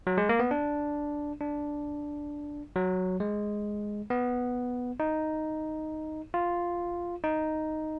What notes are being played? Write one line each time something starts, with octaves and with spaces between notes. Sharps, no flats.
F#3
G#3
A#3
B3
D4
D4
F#3
G#3
B3
D#4
F4
D#4